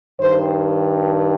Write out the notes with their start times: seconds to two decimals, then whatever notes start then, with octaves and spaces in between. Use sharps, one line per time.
0.19 G2 D#3 C5